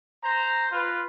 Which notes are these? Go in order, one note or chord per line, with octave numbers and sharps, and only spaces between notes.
C5 A#5
F4 B4